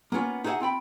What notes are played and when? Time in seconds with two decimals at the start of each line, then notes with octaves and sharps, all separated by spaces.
0.12 A#3 B3 C#4 F4
0.44 D#4 F#4 G#4 E5 F#5
0.60 C4 F4 G5 B5